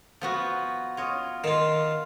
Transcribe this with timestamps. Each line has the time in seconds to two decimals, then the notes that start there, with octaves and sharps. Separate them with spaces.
0.21 F3 B3 F#4
0.97 F4 C#5 D#5
1.44 D#3 F4 F5